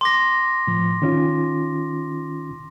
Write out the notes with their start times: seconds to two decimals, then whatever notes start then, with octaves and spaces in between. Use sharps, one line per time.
0.01 C6 D6 A#6
0.67 A2 F3
1.02 D#3 C#4 F4